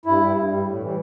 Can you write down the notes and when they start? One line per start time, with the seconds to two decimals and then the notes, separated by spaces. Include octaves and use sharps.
0.05 G2 E4
0.21 G3
0.36 G2
0.51 G3
0.66 A2
0.80 E3 G3